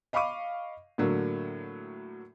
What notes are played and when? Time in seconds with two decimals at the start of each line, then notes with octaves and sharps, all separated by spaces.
0.13 D#5 F5 B5 C#6 D6 D#7
0.98 A2 D3 F#3 A#3